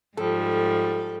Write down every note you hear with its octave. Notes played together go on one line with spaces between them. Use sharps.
G#2 F3 G3 A4